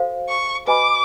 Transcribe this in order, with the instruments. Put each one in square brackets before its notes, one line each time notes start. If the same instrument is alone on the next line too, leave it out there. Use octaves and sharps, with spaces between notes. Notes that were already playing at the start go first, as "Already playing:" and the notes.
Already playing: [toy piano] F#4 A4 C5 F5
[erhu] C#6
[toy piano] F#4 B4 D#5 G#5 B5 [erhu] D6